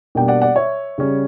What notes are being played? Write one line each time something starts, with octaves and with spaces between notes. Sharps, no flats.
B2 G3 A#3 D4 G5
D5 F#5
D5 F#5
C#5 E5
C#3 G3 C#4